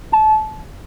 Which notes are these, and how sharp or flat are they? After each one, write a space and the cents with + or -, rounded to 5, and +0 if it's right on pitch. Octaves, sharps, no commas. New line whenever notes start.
A5 -25